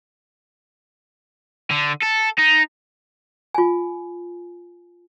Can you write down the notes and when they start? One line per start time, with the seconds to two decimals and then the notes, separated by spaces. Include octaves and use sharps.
1.71 D3
2.03 A4
2.39 D#4
3.54 F4 G#5